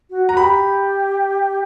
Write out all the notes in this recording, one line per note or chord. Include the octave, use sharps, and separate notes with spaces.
F#4
F#4 A#5
G4 B5